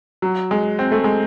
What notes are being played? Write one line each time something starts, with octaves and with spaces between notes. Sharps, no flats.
F#3
G#3
C4
A3
G#3